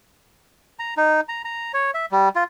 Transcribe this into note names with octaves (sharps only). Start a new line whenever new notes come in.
A#5
D#4
A#5
A#5
C#5
E5
G3
F4